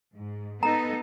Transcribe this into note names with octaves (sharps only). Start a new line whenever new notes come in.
G#2
B3 D#4 A4 A#5